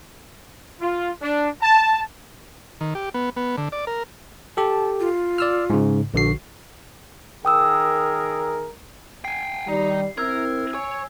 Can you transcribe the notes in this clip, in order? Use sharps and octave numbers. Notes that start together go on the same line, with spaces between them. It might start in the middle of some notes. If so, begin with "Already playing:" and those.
F4
D4
A5
D#3
G4
B3
B3
D3
D5
A#4
G4 A4 A5
F4
D5 E6 F6
G#2 C#3
A#1 D3 F#4 C7
D#3 G#4 A#4 G5 D#6 E6
G5 G#5 C7
D#3 G3 D#4
C4 E4 A#4 E6 G#6
C#5 G#5